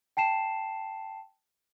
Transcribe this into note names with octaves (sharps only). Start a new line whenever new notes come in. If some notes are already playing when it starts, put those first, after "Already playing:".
G5 A5 C7 E7